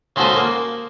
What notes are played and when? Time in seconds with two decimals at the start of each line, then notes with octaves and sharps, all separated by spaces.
0.16 C#3 G#3 D#4 F#4 A4 C5
0.36 A#3